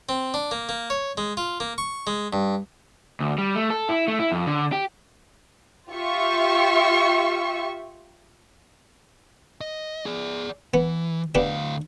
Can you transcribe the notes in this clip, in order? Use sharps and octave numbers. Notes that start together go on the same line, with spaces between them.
C4
D4
A#3
A#3
C#5
G#3
F4
A#3
C#6
G#3
G2
D2
G3
A3
A4
E4
A3
E4
F2
D3
G4
F4 G4 E5 C#6
D#5
G#4 D5
E3 B3
D2 B3 D4 G4 F5